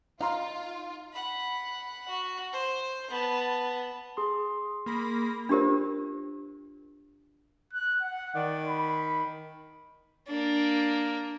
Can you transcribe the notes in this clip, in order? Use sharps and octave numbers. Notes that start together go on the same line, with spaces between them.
D#4 F4 F5 A#5 C6
F#5 B5
F#4
C5
B3 A5
G#4 C6
A#3 B5 A#6
D4 F4 G4 A#4 C5
F#6
F#5
D#3 D5
B5
A#3 D4